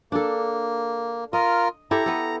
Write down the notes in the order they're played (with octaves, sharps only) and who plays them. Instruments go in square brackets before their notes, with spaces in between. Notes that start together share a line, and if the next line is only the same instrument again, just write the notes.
[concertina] A#3 [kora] D4 A4
[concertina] F4 A#4 [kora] D#5
[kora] E4 G4 A4 [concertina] A#5
[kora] B3 A4